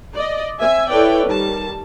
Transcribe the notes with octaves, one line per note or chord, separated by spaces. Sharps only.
D5 D#5
C4 E5 G#5
E4 A4 B4 C#5 D5 G5
D#3 G3 A5